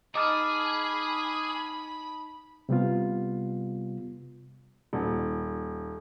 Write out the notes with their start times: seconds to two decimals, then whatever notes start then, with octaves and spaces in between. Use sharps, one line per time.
0.15 D#4 G#4 A5 B5 D6 D#6 F6
2.69 C3 G3 B3 F4
4.93 D#1